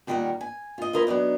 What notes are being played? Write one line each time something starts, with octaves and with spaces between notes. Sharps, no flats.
A#2 D#3 G3 A4 A#4 F#5
G#5
F4 D#5
E4 F4 A#4 C5 D#5
F#3 B3 D4 D#4